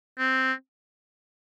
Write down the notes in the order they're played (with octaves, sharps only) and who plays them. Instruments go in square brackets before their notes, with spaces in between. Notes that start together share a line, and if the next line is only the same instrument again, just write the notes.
[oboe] C4